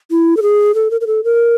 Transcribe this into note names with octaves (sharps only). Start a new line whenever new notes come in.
E4
A4
G#4
A4
A#4
A#4
A4
A#4